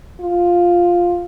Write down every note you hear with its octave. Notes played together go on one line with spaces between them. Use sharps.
F4